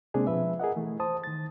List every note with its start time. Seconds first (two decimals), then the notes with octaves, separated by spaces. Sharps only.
0.14 C3 G#3 A#3 C4 D4 G#4
0.27 B2 F3 B4 E5
0.59 G#4 A#4 D#5 F#5
0.77 E3 A3
1.00 C5 A5 D#6
1.24 D#3 A6